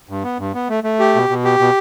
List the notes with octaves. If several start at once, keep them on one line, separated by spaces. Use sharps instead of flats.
G2
B3
G2
B3
A3
A3
G4
B2
B2
G4
B2